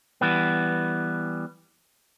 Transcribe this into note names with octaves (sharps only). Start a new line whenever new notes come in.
E3 G3 B3